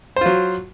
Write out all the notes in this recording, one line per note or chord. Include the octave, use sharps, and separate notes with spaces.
F#3 F4 C5